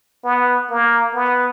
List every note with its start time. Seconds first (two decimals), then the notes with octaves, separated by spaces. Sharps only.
0.24 B3
0.70 A#3
1.15 B3